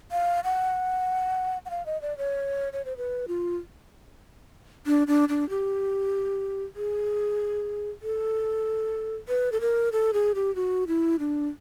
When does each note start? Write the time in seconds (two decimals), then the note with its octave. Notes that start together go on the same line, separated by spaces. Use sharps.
0.12 F5
0.44 F#5
1.65 F#5
1.70 F5
1.86 D#5
2.02 D5
2.18 C#5
2.73 C#5
2.85 C5
2.97 B4
3.28 F4
4.86 D4
5.07 D4
5.29 D4
5.50 G4
6.76 G#4
8.03 A4
9.29 B4
9.52 A4
9.61 A#4
9.92 A4
10.13 G#4
10.35 G4
10.56 F#4
10.88 E4
11.19 D4